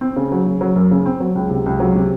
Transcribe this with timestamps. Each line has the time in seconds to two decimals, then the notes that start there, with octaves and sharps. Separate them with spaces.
0.01 C4
0.16 C#3
0.32 F#3
0.46 C#3
0.61 F#3
0.76 F#2
0.91 C#3
1.06 C4
1.20 F#3
1.35 C#2
1.50 C3
1.66 C#2
1.80 F#3
1.95 C3